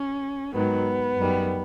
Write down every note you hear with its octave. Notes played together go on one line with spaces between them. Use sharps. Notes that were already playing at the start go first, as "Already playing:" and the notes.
Already playing: C#4
G#2 D#3 F#3 B3
F#2 D#3 G3